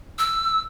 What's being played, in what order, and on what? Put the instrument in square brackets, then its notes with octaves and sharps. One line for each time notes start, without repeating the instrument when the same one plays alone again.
[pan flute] E6